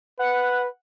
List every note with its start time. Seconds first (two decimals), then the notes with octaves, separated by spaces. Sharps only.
0.19 B4 F#5